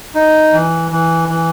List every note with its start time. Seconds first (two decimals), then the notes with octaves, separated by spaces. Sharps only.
0.15 D#4
0.52 E3
0.91 E3
1.28 E3